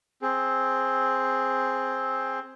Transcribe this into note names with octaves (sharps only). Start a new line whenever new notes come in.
C4 G#4